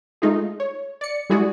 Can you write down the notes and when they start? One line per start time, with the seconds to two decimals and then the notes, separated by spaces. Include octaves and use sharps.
0.22 G#3 A3 D#4 F4 G#4
0.60 C#5
1.01 D5 C#7
1.30 G3 G#3 E4 F#4 G#4 D5